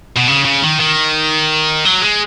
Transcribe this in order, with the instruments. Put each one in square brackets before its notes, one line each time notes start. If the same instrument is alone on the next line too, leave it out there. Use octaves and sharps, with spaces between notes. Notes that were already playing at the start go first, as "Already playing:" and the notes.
[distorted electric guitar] B2
C#3
C#3
D#3
D#3
F#3
G#3